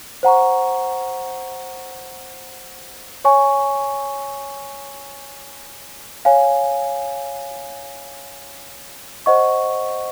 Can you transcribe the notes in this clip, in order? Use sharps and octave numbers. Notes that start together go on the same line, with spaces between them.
C5 F#5 A#5 C#6
C#5 G#5 C#6
C#5 F5 G#5
C5 D#5 F#5 C#6